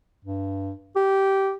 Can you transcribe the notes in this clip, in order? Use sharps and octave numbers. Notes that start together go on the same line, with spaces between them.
G2
G4